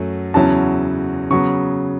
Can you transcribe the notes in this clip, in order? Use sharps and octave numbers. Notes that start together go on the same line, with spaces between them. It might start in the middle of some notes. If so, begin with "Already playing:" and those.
Already playing: F#2 F#3 A3
E2 C#3 F#3 C#4 E4 A5
C#3 F#3 B3 C#6